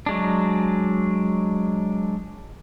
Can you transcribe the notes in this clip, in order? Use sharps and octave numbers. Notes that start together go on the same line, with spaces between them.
F#3 G#3 D4